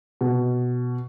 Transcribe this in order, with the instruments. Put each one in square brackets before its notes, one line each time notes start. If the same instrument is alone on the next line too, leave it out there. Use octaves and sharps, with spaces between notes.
[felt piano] B2